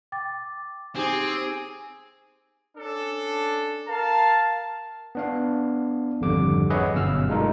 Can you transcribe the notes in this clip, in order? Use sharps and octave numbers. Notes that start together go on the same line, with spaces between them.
G5 D6 A6
C4 D#4 G4 G#4 D6
C#4 D4 A4
A#4 F5 A5
B3 D4 F5
G#1 F2 D3 G3 D6
G#4 B4 C#5 D#5 E5 F#5
G1 F#2 B2 F5 E6 F6
G#3 A3 D4 D#4 F4 A#4